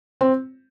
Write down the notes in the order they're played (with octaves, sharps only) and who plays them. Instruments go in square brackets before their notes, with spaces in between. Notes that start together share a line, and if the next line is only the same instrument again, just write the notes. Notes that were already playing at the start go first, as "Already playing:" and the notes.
[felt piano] C4